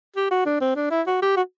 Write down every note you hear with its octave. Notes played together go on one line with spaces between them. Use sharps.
G4
F#4
D4
C4
D4
E4
F#4
G4
F#4